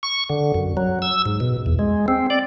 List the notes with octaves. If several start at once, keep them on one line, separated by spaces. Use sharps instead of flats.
C#6
D3
F#2
F#3
E6
G#2
B2
E2
G#3
C4
D5